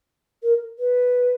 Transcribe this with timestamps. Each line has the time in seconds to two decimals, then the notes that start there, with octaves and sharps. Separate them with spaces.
0.42 A#4
0.79 B4